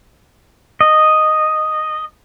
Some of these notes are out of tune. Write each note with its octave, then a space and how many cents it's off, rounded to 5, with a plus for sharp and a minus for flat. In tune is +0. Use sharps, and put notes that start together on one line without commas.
D#5 -5